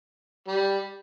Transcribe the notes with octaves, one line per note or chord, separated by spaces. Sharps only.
G3